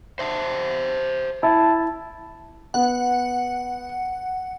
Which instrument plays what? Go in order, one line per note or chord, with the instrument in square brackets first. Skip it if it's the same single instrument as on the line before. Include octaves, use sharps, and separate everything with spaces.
[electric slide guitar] C5 E5 A5
[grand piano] E4 [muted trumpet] A5
[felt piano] B3 [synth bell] F#5